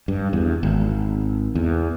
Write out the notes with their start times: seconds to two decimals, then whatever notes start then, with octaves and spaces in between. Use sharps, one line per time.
0.08 G2
0.33 E2
0.63 G#1
1.55 E2